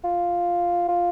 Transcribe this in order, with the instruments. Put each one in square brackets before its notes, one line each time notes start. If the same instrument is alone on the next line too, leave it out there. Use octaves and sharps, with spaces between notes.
[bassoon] F4
F4